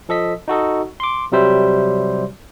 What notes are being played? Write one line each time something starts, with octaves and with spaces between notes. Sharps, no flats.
F3 A4 D#5 B6
D#4 F#4 A4 D#5
C6 D6
C3 F#3 G3 C5 E5